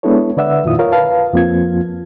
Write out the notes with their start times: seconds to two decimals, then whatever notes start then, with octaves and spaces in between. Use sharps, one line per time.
0.03 G#3 B3 D4 E4 A4 C#5
0.37 D3 B4 D5 E5 F#5 E6
0.64 F2 A#2 D#3 E4 F4 D#6
0.79 F4 A#4 C#5 F5
0.92 B4 F5 A5
1.33 F2 F3 A#3 C4 F4 G#6